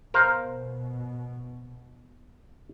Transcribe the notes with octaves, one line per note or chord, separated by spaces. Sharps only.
B2 A#4 C5 F5